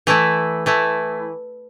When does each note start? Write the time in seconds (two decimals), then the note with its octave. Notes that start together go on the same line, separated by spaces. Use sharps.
0.07 E3 A3 E4
0.66 E3 A3 E4